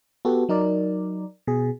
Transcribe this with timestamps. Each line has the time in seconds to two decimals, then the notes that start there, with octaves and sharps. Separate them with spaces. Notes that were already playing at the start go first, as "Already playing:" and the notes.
0.25 B3 F#4 G4 A4
0.49 F#3 D#4 A#4 D5
1.47 B2 G#4